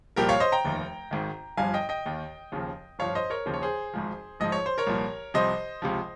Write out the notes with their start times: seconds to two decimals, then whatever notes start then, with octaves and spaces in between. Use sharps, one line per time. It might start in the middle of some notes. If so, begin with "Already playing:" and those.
0.16 C2 A#2 F3 G4 A#4
0.29 C#5 F5
0.40 C5 D#5
0.52 G5 A#5
0.65 F1 D#2 D#3
1.11 G#1 G#2 D#3
1.57 G1 G2 F3 F5 G#5
1.74 D#5 G5
1.89 D#5 G5
2.06 D#2 D#3
2.52 D#2 C#3 F3
2.99 G1 G2 F3 C#5 F5
3.15 C5 D#5
3.30 A#4 C#5
3.46 D#2 C#3 F3 C5
3.54 C#5
3.62 G#4 C5
3.93 G#1 G#2 F3
4.40 A#1 G#2 F3 D#5
4.52 C#5
4.66 C5
4.78 A#4 C#5
4.87 C2 A#2 F3
5.34 C2 C3 F3 C5 D#5
5.82 C#2 C3 F3